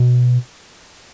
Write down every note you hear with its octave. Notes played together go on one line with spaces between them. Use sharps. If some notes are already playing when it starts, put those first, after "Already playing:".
Already playing: B2